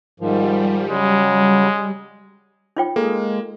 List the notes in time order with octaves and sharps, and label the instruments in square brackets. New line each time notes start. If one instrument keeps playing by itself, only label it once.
[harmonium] G#2 D#3 F3 [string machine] G3
[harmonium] C#3 F#3 [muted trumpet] G#3
[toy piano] D#4 F4 G5
[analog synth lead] G#3 [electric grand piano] A#3 [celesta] A4